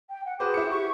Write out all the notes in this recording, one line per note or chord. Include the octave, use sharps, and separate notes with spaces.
G5
F#5
F#4 G#4 B4 C5 D6
E4 C5 C#7
G4 C#6